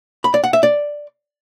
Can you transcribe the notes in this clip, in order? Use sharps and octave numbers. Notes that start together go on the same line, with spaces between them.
B5
D5
F#5
E5
D5